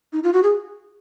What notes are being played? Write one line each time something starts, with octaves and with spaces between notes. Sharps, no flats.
D#4
F4
F#4
G#4